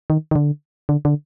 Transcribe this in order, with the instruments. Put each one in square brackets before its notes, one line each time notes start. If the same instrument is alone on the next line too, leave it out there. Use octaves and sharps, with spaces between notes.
[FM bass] D#3
D#3
D3
D3
D3